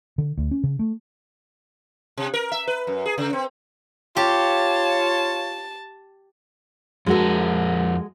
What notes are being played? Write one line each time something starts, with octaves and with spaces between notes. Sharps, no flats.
D3
D2
C#4
C#3
A3
C3
A#4
E5
B4
F#2
G#4
C#3
C4
F4 G4 C#5 A5
F2 G#3 F#4 A4 A#4